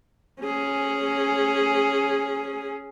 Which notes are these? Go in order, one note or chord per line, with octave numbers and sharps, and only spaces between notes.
C#4 G#4